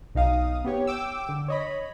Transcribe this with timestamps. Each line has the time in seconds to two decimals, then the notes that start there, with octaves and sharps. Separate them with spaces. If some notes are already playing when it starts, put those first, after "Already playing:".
0.15 B1 D#4 F5 D#6
0.65 B3 G4 C#5
0.87 G5 D6 E6
1.29 D3
1.48 C#5 D#5 B5